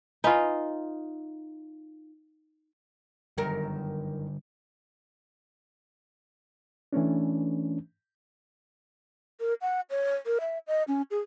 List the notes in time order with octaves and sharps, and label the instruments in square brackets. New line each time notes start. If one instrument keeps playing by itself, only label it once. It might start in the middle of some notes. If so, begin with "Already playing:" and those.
[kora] D#4 F4 [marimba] B4 G#5 B5
[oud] F#2 D#3 A#4 [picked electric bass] D3 G3
[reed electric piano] E3 A3 C#4 D4
[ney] A#4
F#5
C#5
A#4
E5
D#5
C#4
G#4